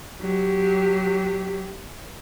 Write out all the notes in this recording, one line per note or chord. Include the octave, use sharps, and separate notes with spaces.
F#3 G4